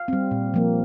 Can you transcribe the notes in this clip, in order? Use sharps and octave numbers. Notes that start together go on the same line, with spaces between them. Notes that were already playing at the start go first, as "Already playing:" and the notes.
Already playing: F5
G3 C4
A#2
F3 A#3